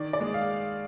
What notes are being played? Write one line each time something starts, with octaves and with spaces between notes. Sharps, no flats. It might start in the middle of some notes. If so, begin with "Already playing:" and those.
Already playing: D#3 D5
D5
G#3
F5